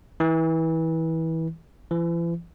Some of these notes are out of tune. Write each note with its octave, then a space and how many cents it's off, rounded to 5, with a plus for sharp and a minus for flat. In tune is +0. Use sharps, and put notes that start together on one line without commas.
E3 -25
E3 +40